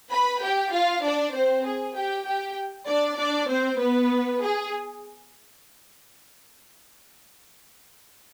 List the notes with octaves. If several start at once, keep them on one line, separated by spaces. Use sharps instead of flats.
B4 B5
G4 G5
F4 F5
D4 D5
C4 C5
G#4
G4 G5
G4 G5
D4 D5
D4 D5
C4 C5
B3 B4
G#4